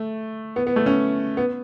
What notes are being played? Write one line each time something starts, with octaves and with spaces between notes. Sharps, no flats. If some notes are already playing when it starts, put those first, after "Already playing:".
Already playing: A3
B3
B3
A3
C#4
B3